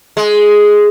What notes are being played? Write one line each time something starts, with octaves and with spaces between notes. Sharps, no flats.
G#3